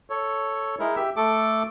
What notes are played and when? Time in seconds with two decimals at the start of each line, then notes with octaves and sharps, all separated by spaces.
0.10 A4 C#5
0.80 G#3 D#4 E4 A#4
0.96 G4 E5
1.16 A3 A4 D6